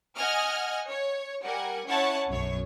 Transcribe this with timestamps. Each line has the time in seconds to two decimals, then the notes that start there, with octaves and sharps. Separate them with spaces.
0.16 D#5 F#5 G#5 D#6 F6
0.87 C#5
1.43 G3 A#4 F#5 G#5
1.87 C#4 E4 C#5 F#5 A5
2.29 B1 F#2 C#5